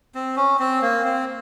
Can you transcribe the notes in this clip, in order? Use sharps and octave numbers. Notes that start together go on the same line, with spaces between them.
C4
C#4
C4
A#3
C4